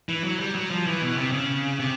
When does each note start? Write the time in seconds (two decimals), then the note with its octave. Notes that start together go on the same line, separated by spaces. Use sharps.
0.09 E3
0.24 F#3
0.40 G3
0.55 F#3
0.71 F3
0.87 E3
1.02 B2
1.18 C3
1.32 C#3
1.80 C3